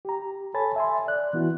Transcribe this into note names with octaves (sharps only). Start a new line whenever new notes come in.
G4 A#5
A4 C#5 G#5 A5 B5 A6
E5 G#5 C6
D5 F#6
E3 B3 E4 F#4